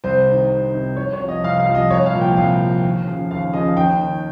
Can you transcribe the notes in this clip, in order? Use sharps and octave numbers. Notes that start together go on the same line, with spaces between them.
C2 C5
C3 D#3
C2
C3 D#3
C2 C#5
C#5
C3 F3
D#5
C2 F5
F5
C3 F3
D#5
C2 C#5
F5
A#2 F3
G5
C2 F5
A#2 F3
D#2
C#3 F3
D#2 F5
C#3 F3 D#5
D#2 G5
D#3